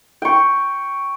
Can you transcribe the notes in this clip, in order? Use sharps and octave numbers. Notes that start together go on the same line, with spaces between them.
G5 C#6